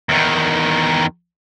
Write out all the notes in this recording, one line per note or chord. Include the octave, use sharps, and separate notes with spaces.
E2 D#3